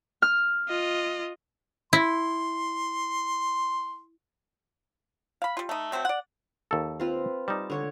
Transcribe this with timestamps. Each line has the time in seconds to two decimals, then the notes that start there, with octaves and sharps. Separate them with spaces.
0.22 F6
0.69 F4 D#5
1.93 E4 C6
5.42 F5 B5
5.57 G3 F4
5.69 A3 D#4
5.92 F#3 A3 C4 E5
6.05 D5 F#5
6.71 D#2 A4
7.00 C4 F4 B4
7.48 G3 D#4 A5
7.70 D3 C#5 C#6